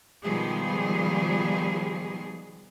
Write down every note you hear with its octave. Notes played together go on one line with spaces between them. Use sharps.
B2 D#3 F3 G3 G#3 G#4